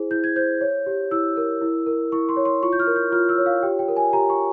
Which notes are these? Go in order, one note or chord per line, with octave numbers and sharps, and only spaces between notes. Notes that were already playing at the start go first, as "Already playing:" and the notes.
Already playing: E4 G#4 C5
E4 G6
G#6
C5 G6
C#5
G4
E4 E6
A#4
E4
A#4
E4 C#6
C6
C#5
C6
F4 C#6
G6
F6
A#4
G6
F4 F6
E6
C#5
F5
G4 G5
G5
A#4
G#5
G4 A#5
C#6